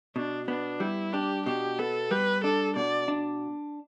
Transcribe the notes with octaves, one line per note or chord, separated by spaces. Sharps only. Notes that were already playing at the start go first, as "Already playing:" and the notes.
B2 D4
B3 D4
G3 E4
D4 G4
B2 G4
B3 A4
G3 B4
D4 A4
B2 D5
D4